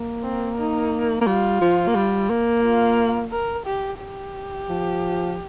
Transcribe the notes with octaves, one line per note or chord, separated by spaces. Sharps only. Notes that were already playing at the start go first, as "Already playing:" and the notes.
Already playing: A#3
C4
D#4
A#3
G3 F4
F3
A#3
G3
A#3
F4
A#4
G4
G4
F3